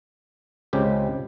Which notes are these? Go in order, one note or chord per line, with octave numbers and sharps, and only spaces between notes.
C#2 C#3 G#3 C4 G4